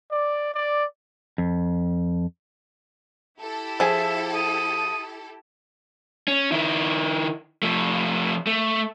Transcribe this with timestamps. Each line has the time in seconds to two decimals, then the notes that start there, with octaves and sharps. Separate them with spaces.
0.11 D5
0.53 D5
1.38 F2
3.39 E4 G4 A4
3.80 F3 G#4 E5
4.34 D#6
6.28 C#4
6.52 D#3 E4
7.63 F3 A3
8.47 A3